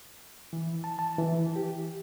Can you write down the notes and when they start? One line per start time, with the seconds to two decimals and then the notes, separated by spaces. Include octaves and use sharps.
0.53 E3
0.84 A5
0.99 A5
1.18 E3
1.56 G4